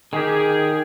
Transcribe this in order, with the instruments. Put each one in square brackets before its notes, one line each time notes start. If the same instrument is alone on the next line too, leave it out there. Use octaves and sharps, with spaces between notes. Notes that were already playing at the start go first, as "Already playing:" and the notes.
[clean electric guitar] D#3 G4 [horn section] G#4